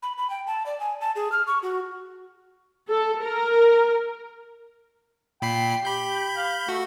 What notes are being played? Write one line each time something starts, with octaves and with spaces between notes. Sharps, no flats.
B5
B5
G5
A5
D5
G#5
A5
G#4
F6
C#6
F#4
A4
A#4
A#2 G5 B5 C7
G4 B5 G6
F5
A3 F#4